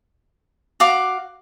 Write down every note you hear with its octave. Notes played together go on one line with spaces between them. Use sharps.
F#4 F5 D6